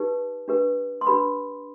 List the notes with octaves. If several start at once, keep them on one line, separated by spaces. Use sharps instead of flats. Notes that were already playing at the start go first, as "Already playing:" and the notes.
Already playing: D#4 G4 B4
D4 G4 B4
C6
D4 G4 B4 B5